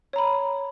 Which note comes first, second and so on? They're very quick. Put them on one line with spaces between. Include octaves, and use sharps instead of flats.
C#5 A#5 B5